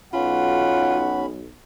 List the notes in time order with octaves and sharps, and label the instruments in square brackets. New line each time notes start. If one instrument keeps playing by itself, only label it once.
[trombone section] B1 [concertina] C#4 B5 [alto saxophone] F4 [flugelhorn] F#5